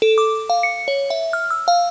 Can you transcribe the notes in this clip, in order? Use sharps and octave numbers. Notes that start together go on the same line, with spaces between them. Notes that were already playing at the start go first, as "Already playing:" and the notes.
A4
D6
F5
C#7
C#5
E5
F6
E6
F5